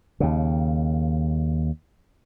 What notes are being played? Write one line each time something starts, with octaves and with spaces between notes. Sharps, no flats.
D#2 C#3